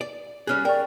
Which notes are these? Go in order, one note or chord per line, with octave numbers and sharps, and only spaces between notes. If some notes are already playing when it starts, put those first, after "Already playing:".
D5
G3 C#4 G#4 F6 F#6
A#4 D5 G5 C#6